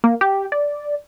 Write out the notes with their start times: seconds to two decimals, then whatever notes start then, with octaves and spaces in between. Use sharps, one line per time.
0.04 A#3
0.21 G4
0.52 D5